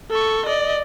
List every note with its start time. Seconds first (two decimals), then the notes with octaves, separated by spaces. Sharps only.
0.10 A4 C#6
0.46 D5 D#5